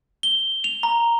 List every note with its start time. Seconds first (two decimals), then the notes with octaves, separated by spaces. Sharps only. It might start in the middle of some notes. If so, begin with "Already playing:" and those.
0.23 G7
0.64 F7
0.83 A#5